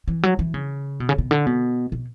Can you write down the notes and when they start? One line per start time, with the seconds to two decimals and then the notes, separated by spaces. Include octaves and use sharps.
0.08 E3
0.23 F#3
0.39 E3
0.54 C#3
1.00 B2
1.09 C#3
1.18 B2
1.31 D3
1.46 B2
1.92 B2